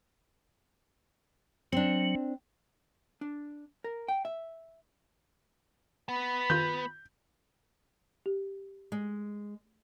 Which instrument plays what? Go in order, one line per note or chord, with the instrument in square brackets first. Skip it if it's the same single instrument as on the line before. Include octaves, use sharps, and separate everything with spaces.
[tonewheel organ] F#3 [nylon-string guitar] C4 D4
[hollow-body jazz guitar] D4
A#4
G5
E5
[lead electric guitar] B3 [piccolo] B5
[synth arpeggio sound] D#3 F4 [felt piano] G6
[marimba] G4
[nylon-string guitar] G#3